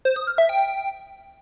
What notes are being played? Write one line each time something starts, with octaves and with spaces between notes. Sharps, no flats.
C5
D#6
F6
E5
G5